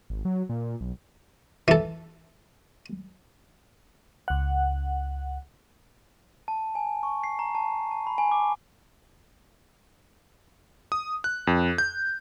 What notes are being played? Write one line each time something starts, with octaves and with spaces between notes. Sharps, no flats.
G#1
F#3
A#2
B1
E3 A4
C#2 F#5
A5
G#5
C#6
C7
A#5
A5
A5
B5
G#5
D6
D#6
F#6
F2
G6